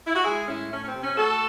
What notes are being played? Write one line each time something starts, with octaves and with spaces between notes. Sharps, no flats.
E4
F#4
G#3 E4 G#4
A2 C#4 E4
A3 C#4
C#4
C4
C3
C#4
A3 F#4 A4